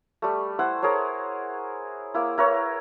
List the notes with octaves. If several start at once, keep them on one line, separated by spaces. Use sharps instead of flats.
G3 A3
E4 C5 F#5
G#4 A#4 C5 C#5
A#3 E4
E4 A#4 B4 C#5